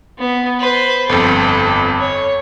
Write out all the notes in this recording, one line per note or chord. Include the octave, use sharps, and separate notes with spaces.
B3
B4 C5
G1 F2 A4
C#5